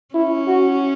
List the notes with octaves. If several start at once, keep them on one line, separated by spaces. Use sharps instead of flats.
C#4 E4
F#4